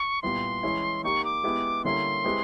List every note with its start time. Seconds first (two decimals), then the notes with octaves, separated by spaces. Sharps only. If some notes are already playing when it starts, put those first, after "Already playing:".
Already playing: C#6
0.22 A#2 G3 B3 E4 C6
0.63 E3 G#3 C#4 E4
1.04 A#3 D#4 G4 C#6
1.24 D6
1.44 G#3 B3 E4 G4
1.84 D3 G3 A#3 C#4 E4 C6
2.24 G#3 C4 E4 G4 B4